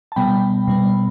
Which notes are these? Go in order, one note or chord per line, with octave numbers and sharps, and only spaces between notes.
A5
B2 G3 B3 G5 B5
B2 G3 B3